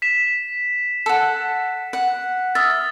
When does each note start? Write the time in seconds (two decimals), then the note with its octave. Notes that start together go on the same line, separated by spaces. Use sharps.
0.02 B6 E7
1.06 A4 F#5
1.93 F#5
2.55 E5 D#6 F6 A6